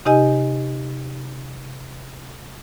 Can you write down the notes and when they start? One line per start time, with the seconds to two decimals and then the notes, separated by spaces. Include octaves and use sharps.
0.05 C3 D#4 G4 D#5 G#5